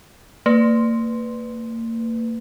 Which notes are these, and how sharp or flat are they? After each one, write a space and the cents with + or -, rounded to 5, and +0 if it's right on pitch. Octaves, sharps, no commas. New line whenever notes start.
A#3 -35 B4 +10